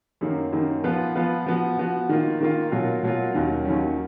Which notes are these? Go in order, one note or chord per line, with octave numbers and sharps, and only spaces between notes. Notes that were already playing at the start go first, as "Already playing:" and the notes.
F#2 D#3 A#3
F#2 D#3 A#3
F3 B3 F4 B4
F3 B3 F4 B4
F3 B3 F#4
F3 B3 F#4
D#3 A#3 F4
D#3 A#3 F4
B2 F#3 A#3 F4
B2 F#3 A#3 F4
D#2 D#3 F#3 C#4
D#2 D#3 F#3 C#4